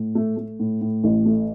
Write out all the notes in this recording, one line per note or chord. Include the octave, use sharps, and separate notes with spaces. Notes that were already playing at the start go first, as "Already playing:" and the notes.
Already playing: A2
A3
A3
A2
A2
A1
A3